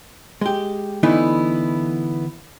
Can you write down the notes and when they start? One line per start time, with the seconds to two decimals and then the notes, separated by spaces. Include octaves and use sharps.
0.41 G#3 G4
1.03 D3 E3 A3 B3 D#4 E4